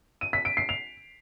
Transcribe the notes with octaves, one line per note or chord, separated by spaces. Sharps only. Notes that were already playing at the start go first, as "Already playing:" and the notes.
D#7
B6
D7
C7
F7